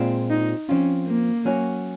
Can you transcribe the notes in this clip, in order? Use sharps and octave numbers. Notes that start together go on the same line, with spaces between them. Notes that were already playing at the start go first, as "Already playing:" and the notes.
Already playing: A#2 G#3 C4 F4
D#4
F3 C4 C#4 F4
A#3
F#3 C#4 F#4